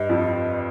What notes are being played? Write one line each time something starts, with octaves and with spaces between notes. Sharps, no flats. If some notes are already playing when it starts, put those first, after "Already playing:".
Already playing: G2 G3 D#5
F2 F3